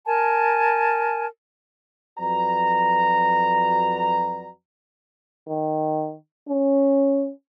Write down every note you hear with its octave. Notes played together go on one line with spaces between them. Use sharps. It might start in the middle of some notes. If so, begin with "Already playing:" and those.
A#4 G#5 A5
F2 F#3 F#4 B4 D5 A#5
D#3
C#4